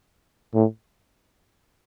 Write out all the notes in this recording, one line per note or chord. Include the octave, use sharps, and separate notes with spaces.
A2